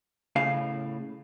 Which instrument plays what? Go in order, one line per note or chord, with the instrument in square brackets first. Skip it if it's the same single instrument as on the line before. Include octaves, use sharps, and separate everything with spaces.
[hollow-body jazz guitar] A2 C#3 F5